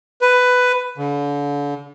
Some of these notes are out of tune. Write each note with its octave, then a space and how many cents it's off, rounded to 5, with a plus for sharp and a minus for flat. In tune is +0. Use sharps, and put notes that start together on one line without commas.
B4 +10
D3 -40